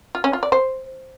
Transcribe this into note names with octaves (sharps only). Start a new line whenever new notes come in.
F4
C#4
F4
D5
C5